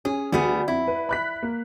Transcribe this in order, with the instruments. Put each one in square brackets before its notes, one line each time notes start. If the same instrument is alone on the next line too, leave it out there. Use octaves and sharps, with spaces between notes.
[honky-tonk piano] C#4 [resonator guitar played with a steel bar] G#4
[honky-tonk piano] D2 [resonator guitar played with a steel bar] G3 B3 G#4
[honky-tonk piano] F2 [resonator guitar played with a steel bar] E4
[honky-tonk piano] B4
B5 F#6 B6
A#3